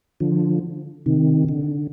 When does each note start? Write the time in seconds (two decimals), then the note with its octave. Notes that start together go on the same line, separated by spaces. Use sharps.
0.20 D3 F3
1.06 C3 D#3
1.49 D3